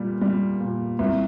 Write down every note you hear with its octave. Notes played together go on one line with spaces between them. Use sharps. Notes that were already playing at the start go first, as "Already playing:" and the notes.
Already playing: A#2 G3
G3
A#2
C2